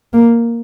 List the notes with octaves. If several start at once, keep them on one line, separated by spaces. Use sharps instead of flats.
A#3